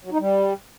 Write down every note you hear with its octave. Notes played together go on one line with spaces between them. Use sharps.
F#3
D#4
G3